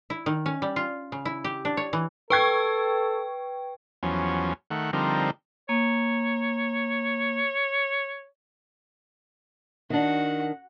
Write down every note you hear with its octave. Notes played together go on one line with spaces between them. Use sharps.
E4
D#3
C#4
G3
F4
C#3
E4
G4
D4
C#5
E3
A4 B4 G5 C#6 G#6
E2 F3 F#3 C#4
D#3 A3 F#5
D3 F3 G3 C4 D#4 A#4
A#3 C#5
D#3 D4 F#4 F#5